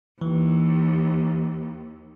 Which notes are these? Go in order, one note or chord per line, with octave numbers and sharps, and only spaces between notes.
D#2 E3